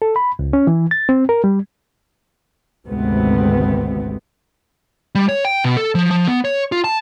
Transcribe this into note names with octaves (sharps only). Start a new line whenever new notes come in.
A4
B5
C#2
C#4
E3
A6
C4
A#4
G3
G#1 D2 G#2 C3 B3 C4
G3
C#5
G5
B2
A4
F3
F3
B3
C#5
F4
A5